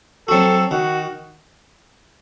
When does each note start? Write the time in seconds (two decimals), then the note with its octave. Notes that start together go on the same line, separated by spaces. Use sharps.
0.28 F#3 C4 F#4 A4
0.71 D#3 F#4